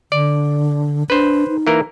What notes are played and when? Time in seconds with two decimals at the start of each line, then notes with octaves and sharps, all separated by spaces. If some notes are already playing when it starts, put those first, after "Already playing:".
0.12 D3 D5
1.10 D4 B4 C5
1.48 D#4
1.67 E3 A#3 A#4